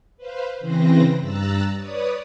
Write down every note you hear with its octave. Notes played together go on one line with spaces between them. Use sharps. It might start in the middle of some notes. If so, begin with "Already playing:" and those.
B4 C5 F5
C#3 E3 C4 B4 C5 A#6
G2 A#5 E6 F#6 A6
B4 C#5 D5 D#6